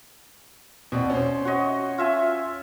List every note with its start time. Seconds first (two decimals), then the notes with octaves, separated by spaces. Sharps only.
0.92 B2 C4 D5
1.10 C#4 C5
1.45 F#4 C#5 D#5
1.98 F4 E5 G#5